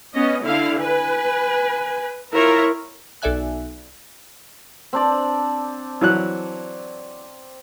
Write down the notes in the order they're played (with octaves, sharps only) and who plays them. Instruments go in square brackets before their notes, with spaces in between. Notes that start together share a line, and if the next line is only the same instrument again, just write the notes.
[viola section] B3 C#4 D#5
D3 E4 F5
[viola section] B4 [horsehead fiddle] G#5
[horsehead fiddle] E4 C#5 [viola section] F4 A#4 E5
[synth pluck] B1 A4 D5 E5 G#5 F#6
[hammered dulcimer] C4 D4 D5
[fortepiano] E3 F#3 F#6